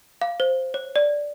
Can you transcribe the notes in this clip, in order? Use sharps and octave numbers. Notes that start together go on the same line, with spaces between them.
F5
C5
C#5
D5